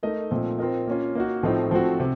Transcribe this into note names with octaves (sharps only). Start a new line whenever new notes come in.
A3 D#4 A#4 D#5
A#2 F3 A3 C4 D#4
C4 F4 A#4 D#5
A#3 C#4 F4
A#3 D#4 F#4
A2 F3 A3 C4 D#4
F3 A3 C4 F#4
C3